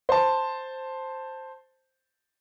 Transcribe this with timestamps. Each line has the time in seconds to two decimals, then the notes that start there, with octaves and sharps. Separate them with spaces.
0.09 C5 A5